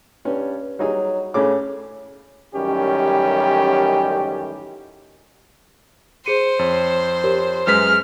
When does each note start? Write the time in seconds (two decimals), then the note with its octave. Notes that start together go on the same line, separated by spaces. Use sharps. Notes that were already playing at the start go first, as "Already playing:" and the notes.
0.25 G2 C#4
0.79 F#3 G3 D#4 G#4
1.34 A2 C#3 C#4 D6
2.55 A1 F#2 D#3 G3 C#4 G4
6.26 G#4 C5 C#7 D#7
6.59 F2 C#5
7.24 G4 A#4 C#5
7.67 F#2 G#3 B4 F6 B6